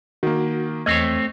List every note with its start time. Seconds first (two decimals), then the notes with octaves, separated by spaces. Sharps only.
0.23 D#3 A#3 F#4
0.86 E2 A3 C4 C#5 D#5 G#6